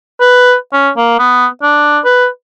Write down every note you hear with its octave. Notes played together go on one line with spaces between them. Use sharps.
B4
C#4
A#3
B3
D4
B4